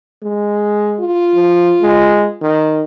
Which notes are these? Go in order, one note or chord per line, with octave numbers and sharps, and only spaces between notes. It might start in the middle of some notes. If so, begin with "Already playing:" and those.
G#3
F4
F3
G#3
D#3